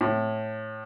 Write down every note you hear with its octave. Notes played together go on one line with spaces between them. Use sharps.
A2